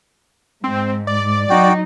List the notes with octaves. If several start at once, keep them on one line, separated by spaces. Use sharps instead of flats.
G#2 C4
D5
F#3 D#4 F#4 G5